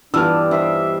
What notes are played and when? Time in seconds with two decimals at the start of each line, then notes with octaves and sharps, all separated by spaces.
0.14 G2 E3 B3 D4 F4 G5 E6 F6
0.51 G3 D4 C5 D#5 E5